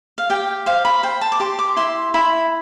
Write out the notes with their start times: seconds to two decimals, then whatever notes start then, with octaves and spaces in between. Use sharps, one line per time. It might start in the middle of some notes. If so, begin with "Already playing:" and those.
0.18 F5
0.30 G4 G5
0.66 C5 F5
0.85 B5
1.03 C5 G5
1.21 A5
1.32 D6
1.40 G4 C6
1.59 D6
1.76 E4 C6
2.14 E4 B5